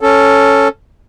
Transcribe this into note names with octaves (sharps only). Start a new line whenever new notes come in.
C#4 A4